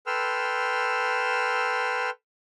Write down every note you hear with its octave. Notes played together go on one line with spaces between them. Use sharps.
A4 B4 G5 C6 E6 F6